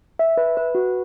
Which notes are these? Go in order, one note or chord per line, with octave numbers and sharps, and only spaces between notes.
E5
B4
B4
F#4